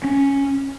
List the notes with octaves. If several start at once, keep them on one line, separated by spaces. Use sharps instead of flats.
C#4